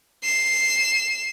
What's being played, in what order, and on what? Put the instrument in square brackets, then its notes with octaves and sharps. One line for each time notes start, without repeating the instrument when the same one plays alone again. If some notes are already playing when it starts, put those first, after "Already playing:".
[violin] C7 E7